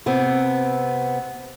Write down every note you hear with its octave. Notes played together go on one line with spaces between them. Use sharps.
C3 B3 C4